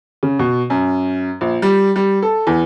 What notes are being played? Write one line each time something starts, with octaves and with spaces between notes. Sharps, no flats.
C#3
B2
F#2
A#1
G3
G3
A4
E2